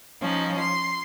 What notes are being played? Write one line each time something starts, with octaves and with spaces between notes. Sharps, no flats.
F3 C#4 D#4
C6